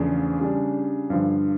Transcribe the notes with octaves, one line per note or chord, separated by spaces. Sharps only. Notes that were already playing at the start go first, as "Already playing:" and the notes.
Already playing: E2 C#3 F3 A3 D4
C#3 G3 D4
G2 D3 F3